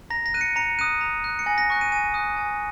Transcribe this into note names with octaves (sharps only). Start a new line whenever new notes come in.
A#5 A#6
A#6
F#6 D#7
C#7
A#5 C#7
D#6 F#6 D#7
A#5
F#6
C#7
G#5 A#6
A#6
C#6 F#6
D#7
G#5 D#7
D#6 F#6
G#5